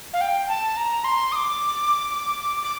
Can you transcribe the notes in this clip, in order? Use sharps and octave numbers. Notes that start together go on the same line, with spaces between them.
F5
G5
A5
A#5
C6
D#6
D6
D6